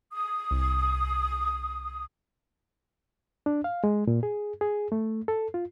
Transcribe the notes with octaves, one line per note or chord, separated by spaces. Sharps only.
D#6
C2
D4
F5
G#3
A#2
G#4
G#4
A3
A4
F4